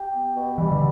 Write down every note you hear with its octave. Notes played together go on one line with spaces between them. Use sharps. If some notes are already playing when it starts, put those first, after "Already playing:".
Already playing: G4
B3
B2
E3 G3
D3